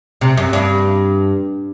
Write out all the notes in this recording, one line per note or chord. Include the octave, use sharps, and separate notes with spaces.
C3
F#2
G2